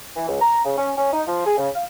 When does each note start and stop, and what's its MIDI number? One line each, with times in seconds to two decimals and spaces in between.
0.16 0.29 52
0.29 0.41 37
0.41 0.64 82
0.65 0.77 49
0.78 0.92 61
0.97 1.12 61
1.13 1.22 63
1.28 1.44 53
1.46 1.55 68
1.58 1.68 49
1.75 1.85 77